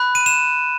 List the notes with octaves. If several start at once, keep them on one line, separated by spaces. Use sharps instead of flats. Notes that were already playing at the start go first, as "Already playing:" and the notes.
Already playing: B5 F#6
D#7
E7